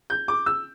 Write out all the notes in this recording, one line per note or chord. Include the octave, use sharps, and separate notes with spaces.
G6
D6
E6